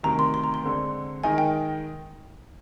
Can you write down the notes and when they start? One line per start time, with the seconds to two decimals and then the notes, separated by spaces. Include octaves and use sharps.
0.03 D2 C3 D#3 A#5
0.19 C6
0.34 C6
0.44 A#5
0.54 C6
0.63 D3 G#3 C4
1.24 D#3 G#3 D#4 A#4 G#5
1.38 G5